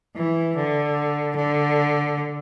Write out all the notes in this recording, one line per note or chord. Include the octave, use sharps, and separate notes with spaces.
E3
D3
D3